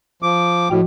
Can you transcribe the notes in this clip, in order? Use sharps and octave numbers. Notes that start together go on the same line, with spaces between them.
F3 D6
A2 F3 F#4 G5